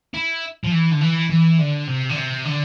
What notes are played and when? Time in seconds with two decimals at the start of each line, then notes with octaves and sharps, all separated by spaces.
0.14 E4
0.64 F3
0.72 E3
0.91 D3
1.01 E3
1.30 E3
1.59 D3
1.87 C3
2.10 D3
2.16 C3
2.45 D3